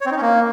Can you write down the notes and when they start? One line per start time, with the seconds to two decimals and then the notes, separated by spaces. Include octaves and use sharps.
0.01 C#5
0.06 C4
0.11 D#4
0.17 C#4
0.22 A#3